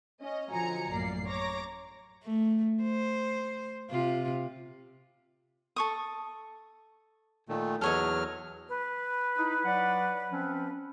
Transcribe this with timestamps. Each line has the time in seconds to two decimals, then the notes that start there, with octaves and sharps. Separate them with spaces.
0.21 C#4 D#5
0.51 D3 F3 F#3 G#5 A#5 C#7
0.91 A1 F#2 A#3 D5 C7
1.26 C#5 A#5 D6 A#6
2.24 A3
2.83 C5
3.90 C3 F4
5.76 A4 C#6 D#6
7.49 A#2 D#3 A3
7.81 E2 F#3 A4 C#5 D#5 F6
8.69 B4
9.38 D#4 E4
9.65 F#3 D5 F#5
10.31 F3 C4 C#4